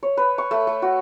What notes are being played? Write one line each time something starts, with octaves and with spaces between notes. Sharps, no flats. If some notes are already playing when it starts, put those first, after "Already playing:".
C#5
B4
C#6
A3
A3
F#4